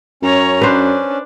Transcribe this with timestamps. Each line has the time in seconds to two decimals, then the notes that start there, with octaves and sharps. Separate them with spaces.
0.22 F#2 C#4 C#5 A#5
0.61 D4 B4 C5